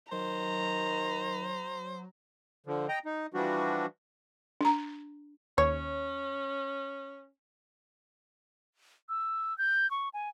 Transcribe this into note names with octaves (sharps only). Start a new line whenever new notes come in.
D#3 F#3 C5 A#5
D3 F3
D#5 G5 A#5
D#4
E3 F3 G3 D4 F#4
D4 A#5
D#2 C#4 C#5
E6
G6
C#6
G#5